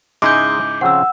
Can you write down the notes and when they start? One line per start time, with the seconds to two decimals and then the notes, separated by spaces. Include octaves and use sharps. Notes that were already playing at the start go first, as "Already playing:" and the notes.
0.22 G#2 C#3 G#3 D#4 E4 D6 G6
0.81 C#3 F3 C4 F#5 E6